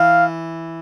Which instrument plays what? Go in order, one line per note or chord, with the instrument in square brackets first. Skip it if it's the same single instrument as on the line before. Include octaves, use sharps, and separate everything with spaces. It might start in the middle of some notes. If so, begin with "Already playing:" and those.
Already playing: [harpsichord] E3 [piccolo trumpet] F5